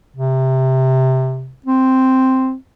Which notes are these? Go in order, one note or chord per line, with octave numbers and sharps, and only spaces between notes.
C3
C4